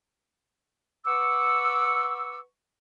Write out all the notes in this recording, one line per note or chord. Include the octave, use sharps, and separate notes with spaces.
B4 F#5 C#6 D6 E6